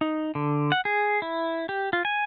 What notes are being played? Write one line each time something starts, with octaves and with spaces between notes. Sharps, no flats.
D#4
D3
F#5
G#4
E4
G4
F4
G#5